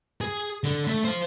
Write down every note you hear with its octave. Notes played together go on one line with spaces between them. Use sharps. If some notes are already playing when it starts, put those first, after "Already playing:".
G#4
D3
A3
C5 F5